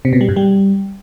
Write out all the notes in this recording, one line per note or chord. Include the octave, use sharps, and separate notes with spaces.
C3
B2
G3
G2
G3